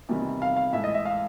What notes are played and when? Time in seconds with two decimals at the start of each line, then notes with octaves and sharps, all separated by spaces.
0.09 E2 C3 D#3 G3
0.42 F5
0.57 F5
0.73 A2 E3 G#3 E5
0.84 D#5
0.94 E5
1.05 F5